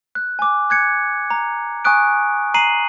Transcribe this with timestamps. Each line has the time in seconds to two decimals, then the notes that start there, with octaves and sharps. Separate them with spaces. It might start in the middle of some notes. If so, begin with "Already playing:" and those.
0.15 F#6
0.39 G#5 D6
0.70 F#6 G#6 C#7
1.30 A#5
1.85 G#5 C#6 D#6 F#6 D7
2.54 A#5 C7 D#7 F#7